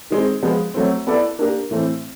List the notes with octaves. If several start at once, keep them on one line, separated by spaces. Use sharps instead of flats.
D#3 G#3 C4
F3 G#3 B3
F#3 A3 C4
B3 E4 A4 D5
A#3 D4 G4 A#4
A2 E3 A3 C4